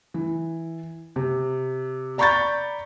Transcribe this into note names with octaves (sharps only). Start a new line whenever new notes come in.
E3
C3
D5 A#5 B5 C#6 G6 A6